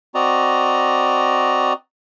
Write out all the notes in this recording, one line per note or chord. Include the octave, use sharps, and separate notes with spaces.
C4 F#4 D5 D#5 A#5